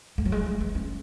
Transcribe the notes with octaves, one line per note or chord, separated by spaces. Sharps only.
A3
F#3
G#3
A3
B3
C#4